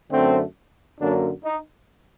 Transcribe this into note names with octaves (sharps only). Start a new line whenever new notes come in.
F#2 D3 A3 C4
F#2 D3 F#3 A#3 D4
D#4